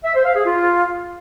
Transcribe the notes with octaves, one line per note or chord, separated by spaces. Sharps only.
E5
C5
F5
G#4
F4